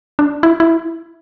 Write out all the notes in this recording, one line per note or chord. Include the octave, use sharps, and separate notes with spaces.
D4
E4
E4